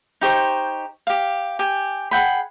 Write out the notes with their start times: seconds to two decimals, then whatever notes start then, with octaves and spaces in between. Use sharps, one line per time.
0.21 D#4 G4 C5 C#6
1.07 G4 F5
1.59 G4 G#5
2.11 G#4 F#5 G5 B5